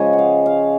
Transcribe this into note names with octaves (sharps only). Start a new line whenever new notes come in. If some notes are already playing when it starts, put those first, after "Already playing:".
Already playing: C#3 F3 G#3 C#5 D#5 G#5
F#5
F5
F5